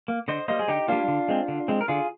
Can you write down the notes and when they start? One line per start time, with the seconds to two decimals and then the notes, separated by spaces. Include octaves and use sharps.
0.08 A#3
0.28 D3 C5 D#5
0.48 G3 A#3 C5 D#5
0.59 G#4
0.68 D3 D#4 G4
0.88 G3 A#3 D4 F4
1.08 D3
1.28 G#3 C4
1.48 D3
1.68 G#3 C4
1.81 A#4
1.88 D3 F4 G#4